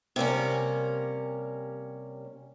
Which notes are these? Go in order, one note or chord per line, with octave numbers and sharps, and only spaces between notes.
C3 G3 A#3 C#4